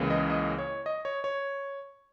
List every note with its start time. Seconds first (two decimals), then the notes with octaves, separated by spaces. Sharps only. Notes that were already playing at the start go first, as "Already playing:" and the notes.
Already playing: C#2 C#3 E3 A#3 E4
0.10 D#5
0.30 D#5
0.58 C#5
0.86 D#5
1.05 C#5
1.24 C#5